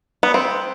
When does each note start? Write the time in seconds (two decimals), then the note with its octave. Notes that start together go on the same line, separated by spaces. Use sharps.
0.23 B3
0.34 C4